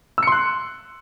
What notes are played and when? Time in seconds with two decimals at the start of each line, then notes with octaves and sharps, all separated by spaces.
0.18 E6
0.23 C#7
0.27 C6
0.32 F#6